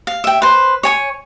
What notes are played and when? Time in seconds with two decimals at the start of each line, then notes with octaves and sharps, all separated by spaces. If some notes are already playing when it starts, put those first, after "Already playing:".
0.07 F5
0.24 E5 G5
0.42 B4 C5
0.83 C#5 G#5 C#6